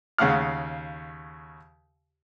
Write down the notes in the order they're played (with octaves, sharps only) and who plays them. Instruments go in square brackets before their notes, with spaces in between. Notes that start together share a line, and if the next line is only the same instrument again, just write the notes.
[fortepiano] D#2 C#3 F5 F#5 F6